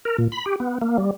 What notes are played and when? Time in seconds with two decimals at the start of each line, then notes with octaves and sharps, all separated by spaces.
0.05 A#4
0.18 A#2
0.32 B5
0.46 G4
0.60 B3
0.81 A#3
0.98 G3